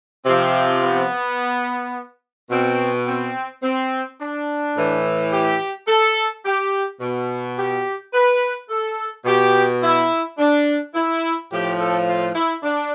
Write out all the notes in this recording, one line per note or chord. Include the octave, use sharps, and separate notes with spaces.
C3 F3 C4
B3
B2 C4
C4
C4
D4
A2 E3
G4
A4
G4
B2
G4
B4
A4
B2 G4
E4
D4
E4
A2 F3 G4
A4
F4
E4
D4